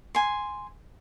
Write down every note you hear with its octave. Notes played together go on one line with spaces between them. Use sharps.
G#5 C6